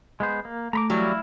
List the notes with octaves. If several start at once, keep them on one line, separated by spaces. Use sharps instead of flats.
G#3 B3 C5
A#3
A3 A#5 B5 D6
E3 F#3 G3 E4 F5